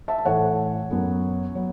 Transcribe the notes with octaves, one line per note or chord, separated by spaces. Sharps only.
E5 A5
A5
A2 E3 A3 C#5 F#5
F#2 F#3 B3
F#3 B3